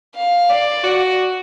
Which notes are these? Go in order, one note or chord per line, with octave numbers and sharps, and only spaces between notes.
F5
D5
F#4